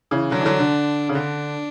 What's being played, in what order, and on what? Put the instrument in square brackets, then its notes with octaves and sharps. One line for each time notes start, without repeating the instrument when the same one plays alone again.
[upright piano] C#3 E3
[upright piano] D3 F#3 [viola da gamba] D4
[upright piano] E3
D3 F#3
D3
C#3
[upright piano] D3 [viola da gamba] D4